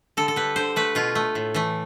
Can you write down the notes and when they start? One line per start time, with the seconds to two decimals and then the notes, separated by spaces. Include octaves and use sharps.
0.17 D3 A4
0.28 A4
0.36 G3 B4
0.56 D3 C5
0.76 A3 B4
0.95 B2 F4
1.15 A3
1.35 A2
1.54 E3 A3